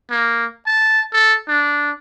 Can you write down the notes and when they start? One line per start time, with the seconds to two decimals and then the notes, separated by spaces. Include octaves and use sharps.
0.10 A#3
0.67 A5
1.13 A4
1.48 D4